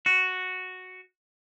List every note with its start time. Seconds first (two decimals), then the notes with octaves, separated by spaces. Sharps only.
0.06 F#4